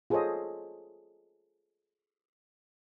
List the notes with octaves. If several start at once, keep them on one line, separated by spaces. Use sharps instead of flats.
F4 G#4 A4 C5 C#5 D#5